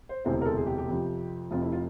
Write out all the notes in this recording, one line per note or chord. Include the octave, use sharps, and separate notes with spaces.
C5
E1 D2 C3 E3 C5
A#4
A4
G#4
G4
G4
F2 C3 F3
F1 F2 C3 F4
E4
F4